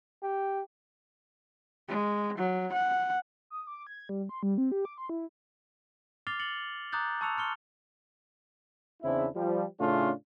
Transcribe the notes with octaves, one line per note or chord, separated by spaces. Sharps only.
G4
G#3
F#3
F#5
D#6
D6
G#6
G3
C6
G3
C4
G4
D6
C6
E4
D6 F6 A6 C7 F7 G7
A6 C#7 F#7 G7
A#5 D6 D#6 F#6 G6 A6
A5 C#6 E6 F#6 C#7 F7
C6 F6 C#7 G7
E2 C#3 C4 D4 E4
F3 G3
A2 C#3 A3 C#4 D4 F4